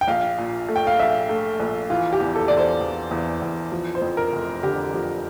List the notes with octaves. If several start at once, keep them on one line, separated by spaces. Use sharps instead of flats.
G5
A#1 F5
A#2
A3
G5
F5
A#1 E5
A3
A#1
E3 F4
G4
E2
A4
E2 D5
C5
E2
E2
E2
F3
C5
F2
A#4
F1
D3 G4
F3